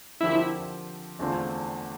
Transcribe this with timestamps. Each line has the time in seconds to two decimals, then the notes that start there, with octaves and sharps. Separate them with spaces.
0.21 D3 F3 C4 E4 G4 A#4
1.19 E2 D3 A3 C4 F4